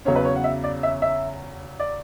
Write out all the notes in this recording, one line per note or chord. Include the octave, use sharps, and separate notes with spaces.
E2 C#3 F#3 C#4 C#5
B4
C#5
F#5
E5
D5
E5
E5
D5